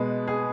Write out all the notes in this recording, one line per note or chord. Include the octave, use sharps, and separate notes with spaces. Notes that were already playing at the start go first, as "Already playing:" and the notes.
Already playing: B2 G#3 B3 B4
G#4